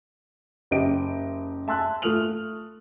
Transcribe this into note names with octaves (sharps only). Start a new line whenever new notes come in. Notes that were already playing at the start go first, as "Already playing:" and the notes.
F#1 G4 D#5 G5 D7
E5 G#5 A5 C6 E6 F#6
A3 F4 D#6 F6 F7 F#7